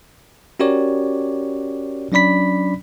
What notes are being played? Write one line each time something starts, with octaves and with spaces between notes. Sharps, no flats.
C#4 F#4 G4 A#4 C#5 D5
F#3 C#4 D4 D5 B5 B6